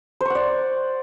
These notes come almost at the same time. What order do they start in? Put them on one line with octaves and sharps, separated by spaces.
C5 C#6 F#5 D5